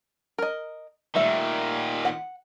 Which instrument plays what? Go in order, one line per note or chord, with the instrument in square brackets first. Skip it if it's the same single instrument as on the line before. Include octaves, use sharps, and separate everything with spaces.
[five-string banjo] A#4 D#5
[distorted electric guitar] A#2 D#3 [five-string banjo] G3 A3 E5
[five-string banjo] F#5